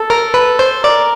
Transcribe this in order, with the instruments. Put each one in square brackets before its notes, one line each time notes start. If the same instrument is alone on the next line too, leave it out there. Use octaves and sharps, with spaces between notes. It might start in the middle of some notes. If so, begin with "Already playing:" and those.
Already playing: [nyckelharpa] A4
[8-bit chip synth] A#4
B4
C5
[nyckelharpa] A#4 [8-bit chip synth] D5